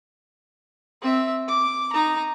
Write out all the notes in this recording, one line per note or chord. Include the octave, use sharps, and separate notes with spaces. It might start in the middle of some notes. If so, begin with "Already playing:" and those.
C4 E5
D6
D#4 A#5